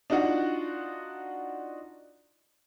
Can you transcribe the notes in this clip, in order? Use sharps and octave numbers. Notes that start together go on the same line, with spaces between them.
D4 D#4 F4 F#4 F#5